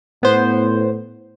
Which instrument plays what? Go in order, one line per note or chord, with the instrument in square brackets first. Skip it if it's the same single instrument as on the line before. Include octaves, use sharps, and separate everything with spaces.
[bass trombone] A2 [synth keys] B3 C5